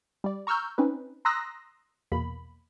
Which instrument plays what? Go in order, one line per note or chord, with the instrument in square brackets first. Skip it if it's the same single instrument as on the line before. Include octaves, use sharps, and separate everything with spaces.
[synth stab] G3 D5
A#5 C#6 E6 F6 G6
C4 C#4 D#4 B4
A#5 C6 D#6 E6 F#6 A#6
A#1 E2 B2 A#3 B5